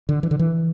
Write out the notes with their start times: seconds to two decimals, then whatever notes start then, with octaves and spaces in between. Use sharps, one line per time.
0.09 D3
0.23 E3
0.31 D3
0.39 E3